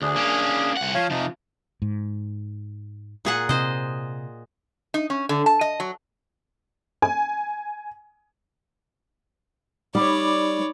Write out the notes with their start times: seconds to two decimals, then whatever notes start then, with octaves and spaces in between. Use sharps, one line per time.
0.02 D2 D4 G#4
0.16 A#3 C#4
0.77 C2 F#5
0.95 F3 C#5 F5
1.10 C3 F3 D#4
1.82 G#2
3.25 A#2 G#4 F#5
3.49 C3 C5 D#5
4.94 D#4
5.10 C#4
5.29 D3
5.46 A5
5.61 D#5
5.80 F#3
7.02 G#5
9.95 G3 D#4 C#5 D5 B5